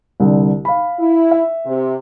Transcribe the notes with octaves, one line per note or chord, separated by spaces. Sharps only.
C2 D3
F5 B5
E4
E5
C3